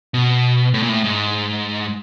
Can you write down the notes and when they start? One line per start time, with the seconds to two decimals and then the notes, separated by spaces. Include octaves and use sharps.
0.14 B2
0.74 A2
0.83 A#2
0.89 A2
1.04 G#2